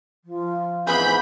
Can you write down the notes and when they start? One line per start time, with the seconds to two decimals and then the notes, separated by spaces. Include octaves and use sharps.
0.25 F3
0.87 G#2 E3 B3 C4 G#4 B5 G6